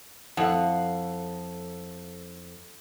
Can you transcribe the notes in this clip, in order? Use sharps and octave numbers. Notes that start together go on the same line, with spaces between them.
F2 E4 A4 F5 F#5